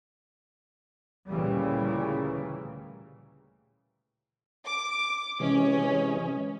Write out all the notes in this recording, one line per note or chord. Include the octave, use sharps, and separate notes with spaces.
D2 A#2 C#3 E3 G3 A#3
D6
C3 E3 G#3 C#4